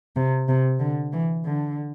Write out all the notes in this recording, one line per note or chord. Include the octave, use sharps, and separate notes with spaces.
C3
C3
D3
E3
D3